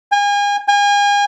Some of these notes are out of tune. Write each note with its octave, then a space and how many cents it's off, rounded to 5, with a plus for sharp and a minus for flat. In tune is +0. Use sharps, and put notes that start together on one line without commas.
G#5 -35
G#5 -35